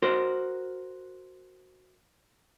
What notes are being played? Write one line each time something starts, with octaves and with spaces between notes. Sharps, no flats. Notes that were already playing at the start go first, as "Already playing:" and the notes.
F#4 A#4 C5